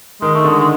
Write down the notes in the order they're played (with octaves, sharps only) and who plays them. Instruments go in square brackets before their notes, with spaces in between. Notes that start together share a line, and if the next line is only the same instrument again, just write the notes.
[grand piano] D#3 [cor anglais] G#3
[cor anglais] A3
[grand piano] D3 [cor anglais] G#3
[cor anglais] G#3